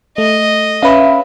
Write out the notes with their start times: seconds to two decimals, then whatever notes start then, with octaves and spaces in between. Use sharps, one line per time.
0.18 A3 D#5
0.83 C#4 B4 E5 F5 B5